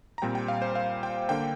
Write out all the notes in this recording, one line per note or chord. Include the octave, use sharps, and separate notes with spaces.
A#5
A#2 G3 C4 G5
G5
F5
C5
F5
G5
D3 A#3 G5